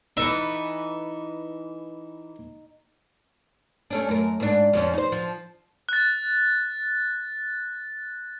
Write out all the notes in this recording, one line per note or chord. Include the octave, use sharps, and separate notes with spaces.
E3 D#4 A4 B4 E5
A3 C#4 D4
F#2 A#4
G#2 D4
F2 F3 C#4
D#4 C5
F3
F#6 A6